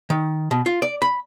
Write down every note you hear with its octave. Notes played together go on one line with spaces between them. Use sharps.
D#3
B2
F4
D5
B5